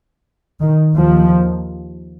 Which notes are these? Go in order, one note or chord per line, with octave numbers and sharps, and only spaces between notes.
D#3
D#2 F3